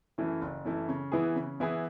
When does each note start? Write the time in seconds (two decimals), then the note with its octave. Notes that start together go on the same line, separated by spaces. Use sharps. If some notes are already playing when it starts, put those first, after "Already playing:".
0.18 F#2 E3 A3 E4
0.41 F#1
0.65 F#2 E3 A3 E4
0.89 C#3
1.12 E3 B3 E4 G#4
1.36 C#3
1.60 E3 B3 E4 G#4